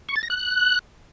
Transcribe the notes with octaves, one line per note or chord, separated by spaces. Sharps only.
C#6
A6
A#6
F#6